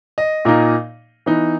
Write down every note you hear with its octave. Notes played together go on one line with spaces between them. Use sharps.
D#5
A#2 A#3 D#4
E3 B3 D#4